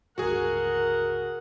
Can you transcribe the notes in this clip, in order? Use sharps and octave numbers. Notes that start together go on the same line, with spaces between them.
G1 C#2 F#4 G#4 A#4 F#5